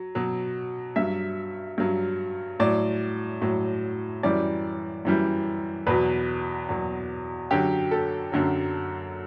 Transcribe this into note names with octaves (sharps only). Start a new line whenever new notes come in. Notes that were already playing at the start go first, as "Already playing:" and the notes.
Already playing: F#3
B2 F#3
G2 F#3 E5
G2 F#3
A2 F#3 D5
A2 F#3
F#2 E3 G3 D5
F#2 E3 G3
E2 B2 F#3 B4
E2 B2 F#3
F#2 D3 F#3 G4
A4
F#2 D3 F#3